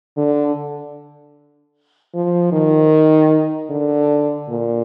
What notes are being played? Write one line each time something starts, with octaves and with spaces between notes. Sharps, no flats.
D3
F3
D#3
D3
A#2